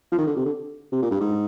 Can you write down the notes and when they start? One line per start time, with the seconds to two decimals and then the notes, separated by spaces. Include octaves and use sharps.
0.12 F3
0.18 D#3
0.27 D3
0.37 C3
0.45 D3
0.92 C3
1.02 A#2
1.11 G2
1.20 G#2